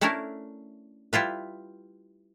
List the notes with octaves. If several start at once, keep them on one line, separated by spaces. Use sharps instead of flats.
A3 C#4 D4 E4 A#4
G3 E4 F4 B4